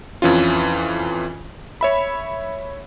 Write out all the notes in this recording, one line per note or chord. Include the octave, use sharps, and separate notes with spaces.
F2 E3 C#4 F4
C#5 E5 B5